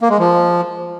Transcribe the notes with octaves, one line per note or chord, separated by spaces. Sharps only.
A#3
G#3
F3